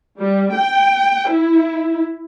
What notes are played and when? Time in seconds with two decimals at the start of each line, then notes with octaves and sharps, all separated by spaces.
0.18 G3
0.53 G5
1.29 E4